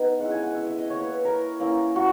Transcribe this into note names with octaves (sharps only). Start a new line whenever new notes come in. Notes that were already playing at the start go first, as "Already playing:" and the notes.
Already playing: B3 D#4
G#3 C#4 E4 F#5
G#5
F#5
E5
E5
D#5
A#3 E4 C#5
B4
A#4
A#3 C#4 E4
F#4